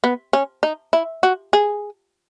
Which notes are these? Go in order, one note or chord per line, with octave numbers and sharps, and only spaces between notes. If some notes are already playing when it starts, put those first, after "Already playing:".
B3
C#4
D#4
E4
F#4
G#4